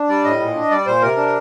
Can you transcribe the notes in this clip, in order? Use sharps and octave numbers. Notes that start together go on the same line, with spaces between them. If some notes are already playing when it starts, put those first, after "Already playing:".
Already playing: D4
G3 D5
A2 D#5
A#2
D4
G3 D5
A#2 C5
C3 A#4
D4